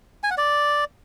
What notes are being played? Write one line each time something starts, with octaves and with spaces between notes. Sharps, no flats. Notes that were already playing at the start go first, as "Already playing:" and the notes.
G#5
F#5
D5